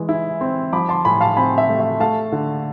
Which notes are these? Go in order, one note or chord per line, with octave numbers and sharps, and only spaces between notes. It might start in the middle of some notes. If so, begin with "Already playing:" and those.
Already playing: E3 G#3
E4
C4
F3 B5 D6
A5 C6
A2 G#5 B5
F5 A5
C4 G#5 B5
E5
A3
E5
A3 F5 A5
D3